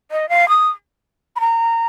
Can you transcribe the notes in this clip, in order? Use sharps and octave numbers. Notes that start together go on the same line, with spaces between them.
D#5
F5
D#6
B5
A#5